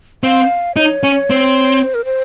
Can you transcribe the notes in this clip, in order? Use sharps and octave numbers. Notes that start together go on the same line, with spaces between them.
C4 F5
D#4 C#5
C#4
C4
C5
A#4
C5